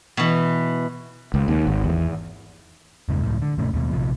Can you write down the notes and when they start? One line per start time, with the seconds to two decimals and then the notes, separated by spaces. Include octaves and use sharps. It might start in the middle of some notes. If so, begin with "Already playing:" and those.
0.17 B2 E3
1.34 C#2
1.48 D#2
1.67 G#1
1.84 E2
3.09 E2 G2 C#3 G#3
3.23 C#2 A2
3.42 D3
3.58 F#1 A#2 C#3 A3
3.74 D#2 B2
3.91 A#1 C3 F3